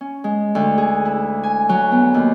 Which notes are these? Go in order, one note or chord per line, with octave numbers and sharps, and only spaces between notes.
C#4
G#3
D2
G#4
E4
G#5
F#3
B3
D#2